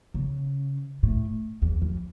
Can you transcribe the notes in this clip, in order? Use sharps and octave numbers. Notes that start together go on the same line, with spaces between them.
C#3
A2
E2
F2